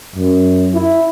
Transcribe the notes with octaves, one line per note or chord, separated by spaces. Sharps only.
F#2
E4